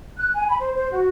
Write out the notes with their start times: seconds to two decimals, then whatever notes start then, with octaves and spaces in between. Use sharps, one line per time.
0.18 F#6
0.35 G#5
0.48 B5
0.60 C5
0.75 C5
0.92 F#4